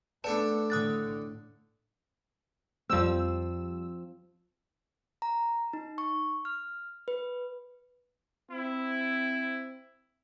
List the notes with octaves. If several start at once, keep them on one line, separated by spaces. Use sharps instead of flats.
A3 B3 D4 A4 B4 D5 F#5 A5
A2 D3 D#6 F#6 A6
F2 F3 G3 C4 E6
A#5
D#4
C#6
F6
B4
C4 E4